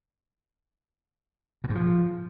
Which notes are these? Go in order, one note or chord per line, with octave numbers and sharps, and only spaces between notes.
B2
G#2
F3